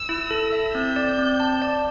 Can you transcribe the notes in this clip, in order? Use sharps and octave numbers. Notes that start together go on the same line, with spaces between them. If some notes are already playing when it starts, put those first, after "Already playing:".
Already playing: E6
E4
A4
E5
C4 G6
D5
C4
A5
D5